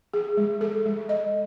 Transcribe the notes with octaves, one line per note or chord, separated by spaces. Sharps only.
G#4
G#3
A4
G#3
D#5